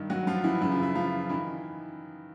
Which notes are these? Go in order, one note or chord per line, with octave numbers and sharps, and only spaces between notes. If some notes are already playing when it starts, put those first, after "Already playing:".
Already playing: G2 D#3
F#3 F#4
F3 F4
E3 E4
F#2 C#3 E3 E4
F4
E3 E4
F3 F4
D#3 E3 E4